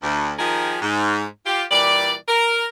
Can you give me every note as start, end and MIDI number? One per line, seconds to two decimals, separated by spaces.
0.03 0.33 38
0.39 0.77 51
0.39 0.77 53
0.39 0.77 63
0.39 0.77 67
0.39 0.77 68
0.39 0.77 70
0.82 1.25 44
1.46 1.64 65
1.46 1.64 67
1.71 2.14 46
1.71 2.14 52
1.71 2.14 55
1.71 2.14 74
2.28 2.66 70